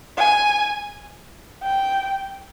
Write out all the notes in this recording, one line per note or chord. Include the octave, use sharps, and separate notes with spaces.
G#5
G5